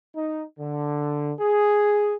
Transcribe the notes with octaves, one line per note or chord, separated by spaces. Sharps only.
D#4
D3
G#4